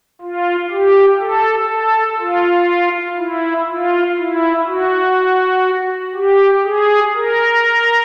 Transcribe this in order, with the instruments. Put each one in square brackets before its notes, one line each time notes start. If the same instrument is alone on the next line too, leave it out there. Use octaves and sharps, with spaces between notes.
[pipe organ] F4
G4
A4
A4
F4
E4
F4
E4
F#4
G4
G#4
A#4